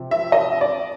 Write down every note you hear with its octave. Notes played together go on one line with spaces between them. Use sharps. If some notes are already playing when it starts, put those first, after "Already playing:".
Already playing: C3 F3
E5
D#5
D5